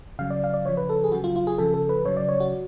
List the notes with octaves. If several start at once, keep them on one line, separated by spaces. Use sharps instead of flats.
C#3 F#3 F5
D5
F5
D5
C#3 F3 C#5
B4
A4
G#4
C#3 F#3 F#4
F4
F4
G#4
C#3 F3 A4
A4
B4
C#3 F#3 C#5
D5
C#5
F#4